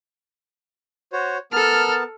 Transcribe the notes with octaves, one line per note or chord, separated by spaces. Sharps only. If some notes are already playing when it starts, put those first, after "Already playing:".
F#4 C5 C#5
B3 A4 A#4 A5 F6